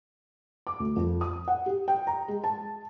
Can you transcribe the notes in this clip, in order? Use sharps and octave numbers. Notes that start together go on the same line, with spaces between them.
D6
D2
F2
D#6
F#5
G4
G5
A#5
G#3
A5